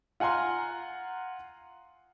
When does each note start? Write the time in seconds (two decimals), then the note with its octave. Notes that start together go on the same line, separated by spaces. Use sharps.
0.20 F4 F#5 G#5 A#5 C6